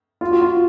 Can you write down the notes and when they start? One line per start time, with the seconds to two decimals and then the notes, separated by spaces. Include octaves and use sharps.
0.21 F4
0.31 F#4
0.41 F4